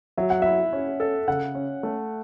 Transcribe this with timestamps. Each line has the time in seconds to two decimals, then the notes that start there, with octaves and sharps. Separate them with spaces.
0.17 F#3 E5
0.30 F#5
0.42 E4 E5
0.73 C#4
1.00 A4
1.28 C#3 F#5
1.55 C#4
1.83 A3